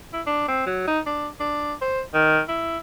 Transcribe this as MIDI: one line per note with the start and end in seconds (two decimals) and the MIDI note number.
0.13 0.21 64
0.27 0.48 62
0.48 0.66 60
0.66 0.87 54
0.88 1.00 63
1.06 1.27 62
1.40 1.74 62
1.81 2.01 72
2.14 2.41 51
2.48 2.78 64